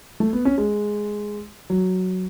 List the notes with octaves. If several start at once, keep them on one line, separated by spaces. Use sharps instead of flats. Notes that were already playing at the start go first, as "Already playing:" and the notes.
A3
B3
C#4
G#3
F#3